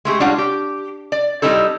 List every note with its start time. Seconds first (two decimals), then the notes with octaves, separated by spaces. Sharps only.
0.05 G#3 A3 G4 G#4
0.20 G3 G#3 D4 F4 C#5 F#5
0.38 G4
1.12 D5
1.42 G3 C4 D#4 E4 A4